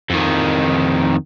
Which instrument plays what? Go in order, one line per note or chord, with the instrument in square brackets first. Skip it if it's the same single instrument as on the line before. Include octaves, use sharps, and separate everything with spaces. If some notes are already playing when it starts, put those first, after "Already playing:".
[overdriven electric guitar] F2 D#3